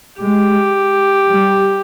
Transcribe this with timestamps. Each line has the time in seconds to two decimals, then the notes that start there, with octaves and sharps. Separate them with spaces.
0.21 G#3 G4
1.29 G3